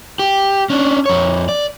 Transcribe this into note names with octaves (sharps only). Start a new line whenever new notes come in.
G4
C#4 D4
F2 C#5
D5